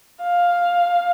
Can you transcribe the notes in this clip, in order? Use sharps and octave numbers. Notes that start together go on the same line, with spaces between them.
F5